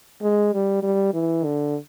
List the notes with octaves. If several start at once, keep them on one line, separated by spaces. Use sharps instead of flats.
G#3
G3
G3
E3
D3